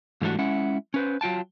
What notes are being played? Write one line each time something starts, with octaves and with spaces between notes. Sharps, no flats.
G#2 E3 G3 A3 D4 F#4
G#3 C#4 E4 F#5
C#4 B4 C5
F#3 F4 G5 A5